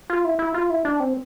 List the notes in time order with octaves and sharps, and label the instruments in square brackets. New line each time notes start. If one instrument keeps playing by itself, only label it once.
[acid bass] F4
E4
E4
F4
E4
D4
C4